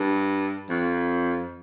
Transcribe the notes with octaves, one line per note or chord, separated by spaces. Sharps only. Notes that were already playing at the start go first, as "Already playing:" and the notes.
Already playing: G2
F2